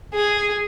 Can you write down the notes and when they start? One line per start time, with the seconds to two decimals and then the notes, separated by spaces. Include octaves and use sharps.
0.13 G#4